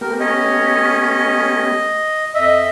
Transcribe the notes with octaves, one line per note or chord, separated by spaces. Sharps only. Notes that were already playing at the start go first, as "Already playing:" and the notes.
A3 B3 G4 A#4
C#4 D#5
F2 D#5 E5